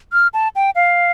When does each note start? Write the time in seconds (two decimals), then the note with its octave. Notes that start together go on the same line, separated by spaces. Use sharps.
0.13 F6
0.34 A5
0.56 G5
0.76 F5